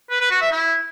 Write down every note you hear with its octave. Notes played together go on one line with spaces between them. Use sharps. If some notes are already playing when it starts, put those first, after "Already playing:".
B4
B4
F#4
E5
E4